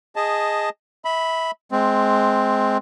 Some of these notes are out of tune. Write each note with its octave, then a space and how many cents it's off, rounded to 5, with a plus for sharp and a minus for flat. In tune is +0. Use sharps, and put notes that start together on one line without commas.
G#4 -15 D#5 +0 A5 +0
E5 -25 B5 +0
G#3 +25 C4 +0